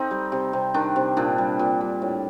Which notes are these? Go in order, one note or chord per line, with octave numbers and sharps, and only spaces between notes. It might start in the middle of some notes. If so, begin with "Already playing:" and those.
Already playing: C4 D#4 A4
G3
C3
C3
D#3 D4
C3
A#2 D4
G3
A#2
G3
A2